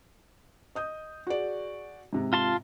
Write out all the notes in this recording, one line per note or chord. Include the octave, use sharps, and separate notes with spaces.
D#5 D#6 G6
F#4 G#4 D5
G#2 C3
F4 A5 C6